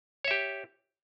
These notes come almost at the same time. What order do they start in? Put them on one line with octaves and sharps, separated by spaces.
C#5 E5 G4